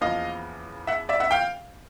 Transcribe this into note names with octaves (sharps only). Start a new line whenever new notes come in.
E2 C#3 F3 A#3 D#5 F5
E5 F#5
D5 E5
E5 F#5
F5 G5